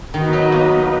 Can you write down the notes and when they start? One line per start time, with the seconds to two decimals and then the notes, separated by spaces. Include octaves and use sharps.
0.14 D#3 B3 D#4 F#4 B4 D#5
0.33 F#3
0.52 A#3